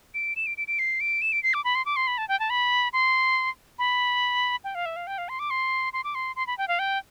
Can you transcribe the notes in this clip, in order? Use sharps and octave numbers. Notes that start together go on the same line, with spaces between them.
D7
E7
D7
D7
D7
C7
D7
E7
D7
C7
D6
B5
C6
D6
C6
B5
A5
G5
A5
B5
C6
B5
G5
F5
E5
F5
G5
F5
C6
D6
C6
C6
D6
C6
C6
B5
G5
F5
G5